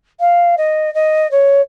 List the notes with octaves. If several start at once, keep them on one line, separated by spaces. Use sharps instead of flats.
F5
D#5
D#5
C#5